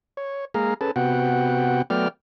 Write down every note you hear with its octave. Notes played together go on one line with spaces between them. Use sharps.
C#5
G#3 A#3 G#4 F5 A#5
C#4 G#4 A4 B4 A5
C3 B3 F#4 F#5 G5
F#3 A3 B3 D5 G5 F6